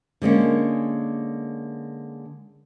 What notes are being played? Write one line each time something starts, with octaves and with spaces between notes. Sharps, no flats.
D3 G#3 A#3 C#4